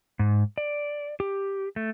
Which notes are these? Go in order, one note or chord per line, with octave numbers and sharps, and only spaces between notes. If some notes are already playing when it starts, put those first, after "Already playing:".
G#2
D5
G4
A3